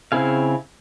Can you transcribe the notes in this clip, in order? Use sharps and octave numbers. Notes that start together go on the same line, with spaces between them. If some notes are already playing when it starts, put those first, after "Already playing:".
C#3 C4 E4 G#4 F5